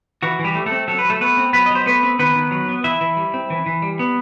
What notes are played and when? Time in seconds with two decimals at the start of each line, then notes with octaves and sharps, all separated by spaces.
0.22 E3 F#4
0.39 E3
0.44 G3 G4
0.55 A3
0.66 A3 C4 A4
0.88 F#3 A4
0.99 B4
1.05 F#3
1.10 A3 A4
1.21 A3 B3 B4
1.37 C4
1.53 F#3 B3 B4
1.66 F#3 D#5
1.75 C5
1.86 A3 B3 B4
2.03 C4
2.19 D#3 B3 B4
2.36 D#3
2.51 F#3
2.69 B3
2.84 E3 E4 E5
3.01 E3
3.17 G3
3.34 C4
3.50 E3
3.66 E3
3.82 G3
3.99 B3